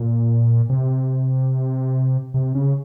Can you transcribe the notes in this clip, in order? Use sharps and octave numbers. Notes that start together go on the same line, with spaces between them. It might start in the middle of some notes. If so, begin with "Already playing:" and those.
Already playing: A#2
C3
C3
C#3